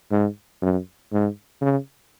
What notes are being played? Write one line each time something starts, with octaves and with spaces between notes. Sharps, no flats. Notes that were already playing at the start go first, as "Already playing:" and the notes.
G#2
F#2
G#2
C#3